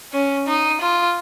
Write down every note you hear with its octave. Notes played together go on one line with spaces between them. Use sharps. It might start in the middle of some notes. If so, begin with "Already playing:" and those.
C#4
D#4
F4